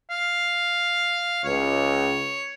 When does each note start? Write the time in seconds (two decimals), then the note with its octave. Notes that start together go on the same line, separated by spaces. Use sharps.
0.10 F5
1.45 C#2 C#5